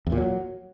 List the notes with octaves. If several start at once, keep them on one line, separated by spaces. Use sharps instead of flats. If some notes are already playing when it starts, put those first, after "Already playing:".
E2
A#2
F#3